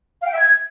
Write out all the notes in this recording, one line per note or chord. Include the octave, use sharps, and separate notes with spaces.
F5
G5
E5
G#6